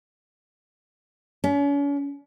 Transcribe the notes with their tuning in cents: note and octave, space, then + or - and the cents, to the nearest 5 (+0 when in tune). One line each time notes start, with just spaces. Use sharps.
C#4 +40